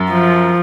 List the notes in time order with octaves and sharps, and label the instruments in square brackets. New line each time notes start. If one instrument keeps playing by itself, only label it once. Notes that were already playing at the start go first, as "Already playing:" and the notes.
Already playing: [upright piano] F#2
[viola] F3